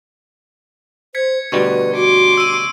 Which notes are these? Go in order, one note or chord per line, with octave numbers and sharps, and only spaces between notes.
C5 G#6 B6 C#7
D2 B2 G3 B4 C#6
F#4 C6 D6
E6 D#7